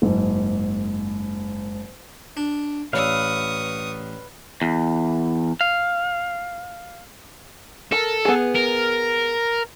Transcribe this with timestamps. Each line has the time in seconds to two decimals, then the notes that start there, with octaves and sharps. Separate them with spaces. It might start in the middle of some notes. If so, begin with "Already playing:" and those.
0.02 F#1 G#2
2.37 D4
2.93 A1 B4 C#5 D5 F5 C#6 D#6 E6
4.62 E2
5.61 F5
7.92 A4 A#4
8.25 B3 G#4
8.55 A#4